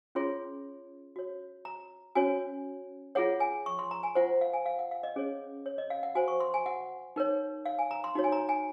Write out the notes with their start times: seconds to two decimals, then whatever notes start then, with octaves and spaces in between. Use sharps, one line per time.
0.15 C#4 F4 G#4 C#5 C6
1.16 F#4 C#5
1.65 A#5
2.15 C#4 F#4 C#5 G#5
3.15 F4 G#4 C#5 F#5
3.40 G#5
3.66 C#6
3.79 C6
3.91 A#5
4.03 G#5
4.15 F4 C5 F#5
4.41 F5
4.53 G#5
4.66 F5
4.79 F#5
4.91 F5
5.03 D#5
5.16 C#4 G#4 C#5
5.66 C#5
5.78 D#5
5.90 F5
6.03 F#5
6.15 F#4 C5 G#5
6.28 C#6
6.40 C6
6.54 G#5
6.66 F#5
7.16 D#4 A#4 C#5
7.66 F5
7.79 G#5
7.91 A#5
8.04 C6
8.15 D#4 F#4 C#5
8.24 G#5
8.32 A#5
8.49 G#5